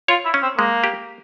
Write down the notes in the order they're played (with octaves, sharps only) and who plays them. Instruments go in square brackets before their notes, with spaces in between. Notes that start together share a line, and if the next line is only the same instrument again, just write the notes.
[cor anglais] F4 [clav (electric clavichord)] C#5
[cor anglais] E4
[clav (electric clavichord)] C#4
[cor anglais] C4
[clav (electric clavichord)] G#3 [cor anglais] A#3
[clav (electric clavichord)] G4